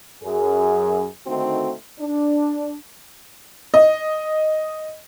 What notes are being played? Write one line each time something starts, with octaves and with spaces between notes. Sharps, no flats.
F#2 G#4
D3 D#3 A3 C4 D#4 F#4
D4
D#5